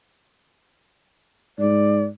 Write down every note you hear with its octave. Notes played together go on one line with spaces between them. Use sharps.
G#2 D5